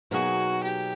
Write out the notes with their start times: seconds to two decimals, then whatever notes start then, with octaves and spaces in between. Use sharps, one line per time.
0.11 B2 F#3 A#3 D#4 F#4 G#4
0.64 G4